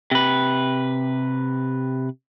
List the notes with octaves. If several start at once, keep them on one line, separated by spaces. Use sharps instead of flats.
C3 B4